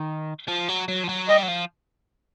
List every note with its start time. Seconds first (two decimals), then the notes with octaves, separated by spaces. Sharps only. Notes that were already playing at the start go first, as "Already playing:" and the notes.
Already playing: D#3
0.48 F3
0.69 F#3
0.88 F#3
1.03 F3
1.09 F#3
1.29 G3 D#5
1.43 F#3
1.48 F3